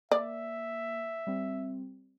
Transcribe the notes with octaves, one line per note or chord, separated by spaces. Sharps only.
A#3 D5 E5
G3 C4